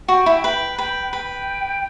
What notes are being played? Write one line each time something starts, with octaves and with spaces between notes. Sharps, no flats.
F#4 G5
E4
B4 G5
B4 G5
B4 G5